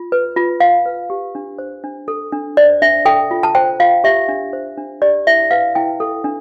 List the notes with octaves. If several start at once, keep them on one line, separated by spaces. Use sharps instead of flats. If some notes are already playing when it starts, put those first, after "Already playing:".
Already playing: F4
B4
F4
F4 F5
B4
G4
D4
C5
D4
A4
D4
C5 D5
D4 E5
A4 G5
F4
A5
C5 G5
F4 F5
G4 E5
D4
C5
D4
G4 D5
E4 E5
B4 F5
E4 G5
A4
D4